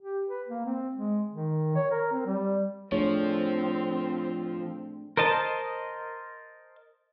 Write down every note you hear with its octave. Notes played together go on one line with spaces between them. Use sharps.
G4
B4
A#3
C4
G#3
D#3
C#5
A#4
C4
G3
F3 A3 C4 D4 G#4 C#5
A#4 C5 D#5 A5